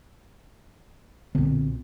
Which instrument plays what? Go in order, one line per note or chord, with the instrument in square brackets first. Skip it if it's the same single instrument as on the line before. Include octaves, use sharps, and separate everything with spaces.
[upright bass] B1 A#2 [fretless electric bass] D3 B3 C4